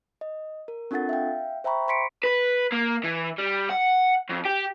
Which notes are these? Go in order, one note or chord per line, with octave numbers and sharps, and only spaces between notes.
D#5
A#4
C4 D4 F4 A4 F#5 A6
E5 F5 G5
C5 E5 G5 A#5 B5 C#6
C5 B5 C6 B6 C#7 D7
B4
A#3
E3
G3
F#5
F2
G4